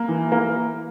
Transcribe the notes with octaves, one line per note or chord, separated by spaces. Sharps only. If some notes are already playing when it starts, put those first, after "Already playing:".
Already playing: A#3
E3
A#3